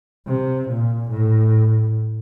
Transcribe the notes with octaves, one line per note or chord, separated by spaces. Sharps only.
C3
A#2
A2